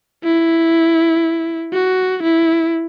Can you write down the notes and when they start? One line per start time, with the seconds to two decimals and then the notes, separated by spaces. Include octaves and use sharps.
0.24 E4
1.73 F#4
2.23 E4